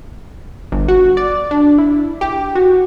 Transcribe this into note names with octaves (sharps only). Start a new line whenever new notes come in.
G1
F#4
D5
D4
E4
G4
F#4